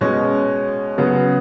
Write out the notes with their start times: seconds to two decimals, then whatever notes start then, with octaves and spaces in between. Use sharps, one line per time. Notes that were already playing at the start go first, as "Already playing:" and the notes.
0.01 B2 G#3 C#4
0.98 C#3 F#3 B3